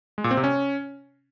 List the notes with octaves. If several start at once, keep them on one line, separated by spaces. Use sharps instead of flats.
G#3
A#2
C4
C3
C#4